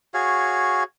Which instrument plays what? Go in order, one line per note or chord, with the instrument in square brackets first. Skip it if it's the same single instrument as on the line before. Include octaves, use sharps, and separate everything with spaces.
[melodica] F#4 G#4 C#5 F5